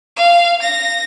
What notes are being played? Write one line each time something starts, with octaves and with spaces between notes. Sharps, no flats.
F5
A#6